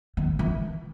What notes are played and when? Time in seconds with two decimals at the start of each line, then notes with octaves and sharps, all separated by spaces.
0.17 D#3
0.39 E3